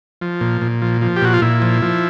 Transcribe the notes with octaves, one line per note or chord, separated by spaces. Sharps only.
F3
A#2
A#2
F3
F3
G4
A#2 F#4
F4
A#2 E4
F3
F3